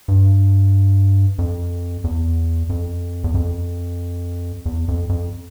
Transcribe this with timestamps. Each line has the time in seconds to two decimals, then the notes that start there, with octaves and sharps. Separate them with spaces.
0.08 G2
1.39 F2
2.04 E2
2.70 F2
3.24 E2
3.34 F2
4.66 E2
4.88 F2
5.09 F2